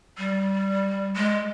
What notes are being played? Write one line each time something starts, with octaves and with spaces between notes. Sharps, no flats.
G3
G#3